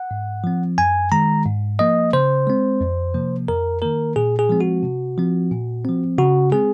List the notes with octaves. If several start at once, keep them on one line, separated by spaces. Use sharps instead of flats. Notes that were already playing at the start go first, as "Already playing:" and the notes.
Already playing: F#5
G#2
F3 C4
F#2 G#5
D#3 G#3 A#5
G#2
F3 A#3 D#5
C#3 C5
G#3 C4
F2
C3 F3 A#3
F2 A#4
D#3 A#3 A#4
A#2 G#4
G#4
F3 G#3 C4
F#4
C3
F3 C4
A#2
F3 C4
C#3 F#4
G#3 C4 G#4